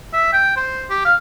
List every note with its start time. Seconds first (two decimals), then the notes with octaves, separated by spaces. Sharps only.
0.13 E5
0.33 G5
0.57 C5
0.90 G4
1.05 F5